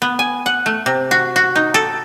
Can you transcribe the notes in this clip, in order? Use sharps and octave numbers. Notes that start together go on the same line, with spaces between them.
B3
G#5
F#5
A3
C3
F#4
F#4
D#4
A4